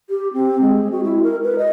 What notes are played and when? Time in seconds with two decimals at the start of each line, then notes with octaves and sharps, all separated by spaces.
0.10 G4
0.34 C4
0.62 G#3
0.92 F#4
1.04 E4
1.23 A#4
1.44 B4
1.58 D#5